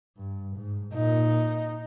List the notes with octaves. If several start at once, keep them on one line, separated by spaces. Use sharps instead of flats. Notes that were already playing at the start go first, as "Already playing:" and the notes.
G2
G#2
A#2 D#4